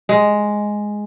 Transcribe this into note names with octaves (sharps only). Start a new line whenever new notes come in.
G#3